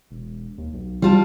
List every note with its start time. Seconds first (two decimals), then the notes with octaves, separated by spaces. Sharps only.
0.11 E1
0.58 D#2
0.73 B1
1.02 G3 F4 A5